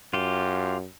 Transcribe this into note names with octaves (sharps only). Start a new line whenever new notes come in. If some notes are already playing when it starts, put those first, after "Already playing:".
F#2 F4 G4